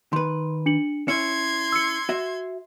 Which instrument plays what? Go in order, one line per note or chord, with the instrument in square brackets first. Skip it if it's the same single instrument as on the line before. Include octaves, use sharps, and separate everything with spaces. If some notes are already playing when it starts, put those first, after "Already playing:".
[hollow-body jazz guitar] D#3 B4 [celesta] C6
[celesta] D4 C#7 F#7
[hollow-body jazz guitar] C#4 E4 [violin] C6 G#6 [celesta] C#7
[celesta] E6 C#7
[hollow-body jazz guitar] F#4 E5